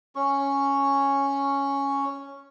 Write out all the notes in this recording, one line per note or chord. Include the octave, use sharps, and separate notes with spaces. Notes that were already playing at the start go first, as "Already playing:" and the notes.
C#4 C#6